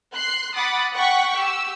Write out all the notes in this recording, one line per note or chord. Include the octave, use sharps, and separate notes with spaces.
C6 F#6 C7
F#5 B5 D6 D#6 A6
F#5 G5 C#6 F#6 B6
G4 E6